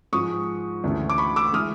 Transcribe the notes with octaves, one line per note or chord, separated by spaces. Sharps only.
G#2 F3 G#3 C#6 D#6
D2 C#3 E3 A3
D6
B5 C#6
D6 E6
E3 G#3 D#6 F6